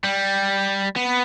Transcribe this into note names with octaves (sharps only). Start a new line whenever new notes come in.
G3
B3